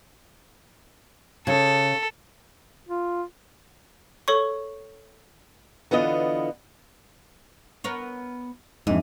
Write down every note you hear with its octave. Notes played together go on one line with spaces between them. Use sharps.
C#3 A4
F4
A4 C#5 C#6
D3 E3 B3 F4 D#5
B3 A#4 C#5
F2 G#2 E3 D4 D#5